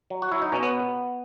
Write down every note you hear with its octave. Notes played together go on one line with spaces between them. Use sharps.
F#3
F#4
F#3 E4
D#4
B2 C#4
B3